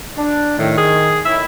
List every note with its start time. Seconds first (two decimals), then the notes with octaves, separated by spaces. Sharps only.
0.17 D4
0.58 A2 D#3
0.77 G#4
1.25 A2 D#3 E4 E5